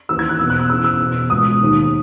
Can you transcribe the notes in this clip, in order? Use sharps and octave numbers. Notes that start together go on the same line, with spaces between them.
D#2 C#3 E3 E6
G#6
F#6
E2 B2 E6
F#6
E6
E2 C#3 E3 E6
E6
E2 B2
C#2 B2 D#6
D#2 D#3